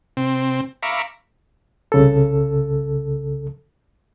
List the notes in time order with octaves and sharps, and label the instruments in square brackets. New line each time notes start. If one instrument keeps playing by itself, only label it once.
[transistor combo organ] C3 C4
E5 F5 A#5 B5 C#6 D6
[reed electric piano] C2 C#3 A4